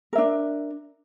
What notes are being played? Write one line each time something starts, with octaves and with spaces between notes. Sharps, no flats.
D4 A#4 E5